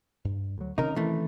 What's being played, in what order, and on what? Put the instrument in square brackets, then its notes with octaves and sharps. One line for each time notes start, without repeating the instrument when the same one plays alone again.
[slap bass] G2
D2 F#3
[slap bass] C3 D#3 C#4 [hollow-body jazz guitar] D#4 A#4
[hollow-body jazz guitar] E3 A3